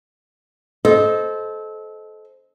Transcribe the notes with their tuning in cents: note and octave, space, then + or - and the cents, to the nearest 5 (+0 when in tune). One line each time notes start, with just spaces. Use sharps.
A4 -25 C5 +0 D#5 +0